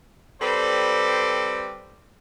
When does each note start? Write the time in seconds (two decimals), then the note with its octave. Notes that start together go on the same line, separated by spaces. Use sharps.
0.41 G3 C4 A4 B4 C5 D5